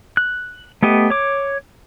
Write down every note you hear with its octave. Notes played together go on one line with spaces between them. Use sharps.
F#6
A3 B3 G4 D#5
C#5 D6